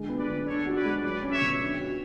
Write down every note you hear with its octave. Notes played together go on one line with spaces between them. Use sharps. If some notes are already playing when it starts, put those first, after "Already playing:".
Already playing: D3 G#3
B3
B4 D5
D3
D4 A4 C#5
F#4
B4 D5
G#3
F#3 B4 D5
C#4
C#5 E5
B2
D4
F#4